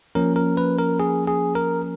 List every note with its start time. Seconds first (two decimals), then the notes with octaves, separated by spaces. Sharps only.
0.15 F3 A#3 C#4 A#4
0.36 A#4
0.57 B4
0.78 A#4
1.00 G#4
1.28 G#4
1.55 A#4